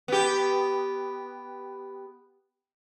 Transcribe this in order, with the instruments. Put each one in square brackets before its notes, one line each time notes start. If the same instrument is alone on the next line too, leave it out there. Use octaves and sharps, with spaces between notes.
[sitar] B3 G4